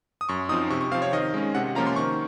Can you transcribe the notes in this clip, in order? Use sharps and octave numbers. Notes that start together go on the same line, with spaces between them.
D#6
F#2 C#6
F3 C4 D#4 D#6
C3 C#6
C#6
F3 C4 F5
C#5
D#3 D#5
G#3 C#4
C3 F#5
F3 A#3 C#4 F4 A#5
C6
D#3 C#6